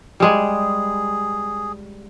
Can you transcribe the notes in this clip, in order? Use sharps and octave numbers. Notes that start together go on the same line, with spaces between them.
G3 G#3 G#4